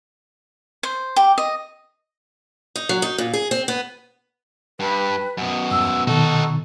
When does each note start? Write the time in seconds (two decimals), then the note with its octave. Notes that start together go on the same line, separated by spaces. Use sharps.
0.83 C5
1.16 G4
1.38 D#5
2.76 D#4
2.89 F#3
3.02 D#4
3.18 A#2
3.34 G#4
3.51 C4
3.68 B3
4.80 G2 B4
5.37 F#2 B2
5.71 E2 G2 E6
6.07 B2 D#3 D#4 F#4 A4